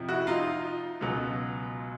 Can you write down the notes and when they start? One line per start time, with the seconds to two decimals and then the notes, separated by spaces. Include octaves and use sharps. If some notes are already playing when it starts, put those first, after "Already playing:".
Already playing: F2 C3 F3
0.09 E4 F#4
0.27 D#4 F4
1.01 C#2 B2 F#3